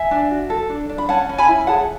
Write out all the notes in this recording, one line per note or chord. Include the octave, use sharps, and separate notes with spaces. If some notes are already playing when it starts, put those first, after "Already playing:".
Already playing: E5 G#5
D4
F#4
A4
D4
D4
B5
C#4 F#5 A5
C#4
G#5 B5
E4
G#4 F#5 A5